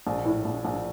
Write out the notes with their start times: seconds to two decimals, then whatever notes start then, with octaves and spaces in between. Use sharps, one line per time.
0.07 A#1
0.25 A2
0.45 A#1
0.65 A#1